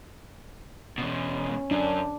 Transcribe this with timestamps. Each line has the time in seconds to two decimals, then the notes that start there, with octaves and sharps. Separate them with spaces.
0.98 E2 B2 C#4
1.71 F#2 D4